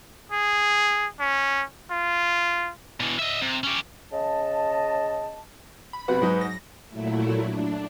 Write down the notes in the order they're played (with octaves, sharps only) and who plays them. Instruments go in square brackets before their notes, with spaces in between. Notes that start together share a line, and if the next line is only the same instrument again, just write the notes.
[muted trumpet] G#4
C#4
F4
[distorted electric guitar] B2 E3
D#5 E5
C3
C#4 G4
[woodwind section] C#3 D#5 A5
[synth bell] B5
[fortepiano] B1 C3 F#4 [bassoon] B4 [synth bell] F#5
[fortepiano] G#2 D#4 [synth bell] F#3
[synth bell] A#6
[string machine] A#2 F#3 A3 E4
D4